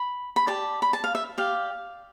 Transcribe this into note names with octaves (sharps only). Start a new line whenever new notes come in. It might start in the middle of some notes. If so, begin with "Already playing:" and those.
Already playing: B5
B5
G4 D5 A5
B5
A5
F5
E5
G4 D5 F5